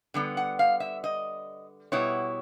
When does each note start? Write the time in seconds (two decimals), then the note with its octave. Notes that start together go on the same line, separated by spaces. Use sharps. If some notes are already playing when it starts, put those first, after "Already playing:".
0.14 D3 G3 B3
0.37 F#5
0.59 F5
0.80 E5
1.04 D#5
1.92 B2 G3 B3 E4 C#5